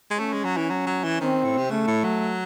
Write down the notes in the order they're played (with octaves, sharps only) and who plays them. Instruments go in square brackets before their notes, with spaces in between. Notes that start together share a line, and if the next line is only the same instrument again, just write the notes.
[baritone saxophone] G#3
[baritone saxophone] A3 [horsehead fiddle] C#4
[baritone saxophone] G#3
F#3
E3
F#3
F#3
E3
[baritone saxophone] D#3 [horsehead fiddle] C4
[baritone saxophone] A2
C3
[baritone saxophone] C#3 [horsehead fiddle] A3
[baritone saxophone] A2
F#3